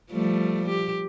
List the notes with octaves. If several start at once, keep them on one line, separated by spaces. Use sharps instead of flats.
F3 G3 A3
G4